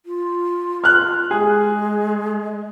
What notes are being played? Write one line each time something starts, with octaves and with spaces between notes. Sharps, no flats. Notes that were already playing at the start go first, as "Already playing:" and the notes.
F4
F6 F#6
G#3 G#4